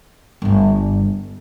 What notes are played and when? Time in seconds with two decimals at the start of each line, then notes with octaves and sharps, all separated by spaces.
0.42 G1 G2